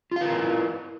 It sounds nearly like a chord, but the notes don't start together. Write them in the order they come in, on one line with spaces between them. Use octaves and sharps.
F4 F5 B4 A#4 E4